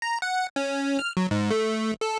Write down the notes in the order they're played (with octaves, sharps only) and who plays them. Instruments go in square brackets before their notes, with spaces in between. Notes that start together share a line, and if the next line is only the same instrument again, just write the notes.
[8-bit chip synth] A#5
F#5
C#4
F6
F#3
G#2
A3
A4